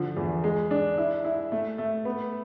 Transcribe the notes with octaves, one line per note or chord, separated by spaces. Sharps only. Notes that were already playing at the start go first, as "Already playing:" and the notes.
Already playing: D3 F3
E2
G#3
D4
E4
E4
A3
A3
B3